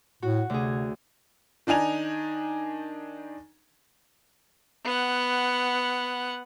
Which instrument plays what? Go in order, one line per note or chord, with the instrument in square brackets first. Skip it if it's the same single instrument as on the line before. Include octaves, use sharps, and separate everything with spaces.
[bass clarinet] A2 [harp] F#4
[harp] D2 G#4 [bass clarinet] C3
[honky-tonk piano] D#3 D4 D#4 G#5 F7
[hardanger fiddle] B3 F#5